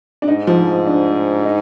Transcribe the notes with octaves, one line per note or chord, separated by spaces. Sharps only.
D4
G#2 D#4
F3
D4
D#4